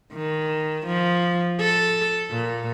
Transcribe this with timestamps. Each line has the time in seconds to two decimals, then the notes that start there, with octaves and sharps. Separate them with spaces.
0.14 D#3
0.87 F3
1.60 A4
2.31 A#2